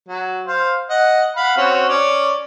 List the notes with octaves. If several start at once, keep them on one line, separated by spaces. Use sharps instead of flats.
F#3
C5 F5
D#5 F#5
F5 F#5 B5
C4 C#4 F#4
C#4 D5